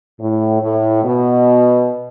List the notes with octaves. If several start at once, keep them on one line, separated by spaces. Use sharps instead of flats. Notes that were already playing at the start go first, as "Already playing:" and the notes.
A2
A2
B2